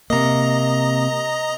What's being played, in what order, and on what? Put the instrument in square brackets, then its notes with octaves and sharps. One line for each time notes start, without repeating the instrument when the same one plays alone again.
[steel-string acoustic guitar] C3 A#3 [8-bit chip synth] D#5 A#5